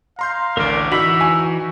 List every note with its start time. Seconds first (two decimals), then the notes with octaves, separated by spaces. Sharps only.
0.19 F5 A#5 C6 G6
0.57 A1 D2 A#4 D5
0.92 E3 D#4 F#4 B5 E6
1.21 G#5